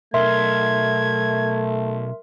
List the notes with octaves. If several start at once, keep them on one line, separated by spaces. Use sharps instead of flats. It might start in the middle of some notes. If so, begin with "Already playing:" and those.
B1 A3 A#4 E5 C6 G#6